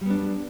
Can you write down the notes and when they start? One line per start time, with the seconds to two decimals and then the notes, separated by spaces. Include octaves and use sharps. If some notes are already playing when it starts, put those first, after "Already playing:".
0.01 G3
0.06 B3
0.10 D4